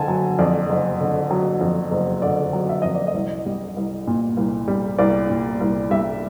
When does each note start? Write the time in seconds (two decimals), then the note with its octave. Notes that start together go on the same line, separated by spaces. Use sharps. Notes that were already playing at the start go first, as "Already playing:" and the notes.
Already playing: F#1 D3 G#5 A5
0.08 F#3
0.39 F2 D5
0.70 F#1
1.00 D3
1.31 F#3
1.61 F2
1.91 F#1
2.22 D3 D5
2.53 F#3
2.69 E5
2.82 F2 D#5
2.95 D5
3.07 D#5
3.14 C2
3.46 G3
3.76 C2
4.07 A#2
4.37 C2
4.68 G3
4.99 C2 D5
5.29 A#2
5.61 C2
5.90 G3 E5